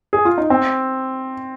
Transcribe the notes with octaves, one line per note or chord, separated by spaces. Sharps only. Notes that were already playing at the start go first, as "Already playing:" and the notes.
G#4
F4
D#4
C4